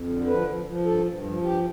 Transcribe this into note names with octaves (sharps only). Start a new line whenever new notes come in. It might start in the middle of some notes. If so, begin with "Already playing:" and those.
Already playing: F2
D3
F3 B4
F3
F3
G2 A4
G2
F3
G2 G4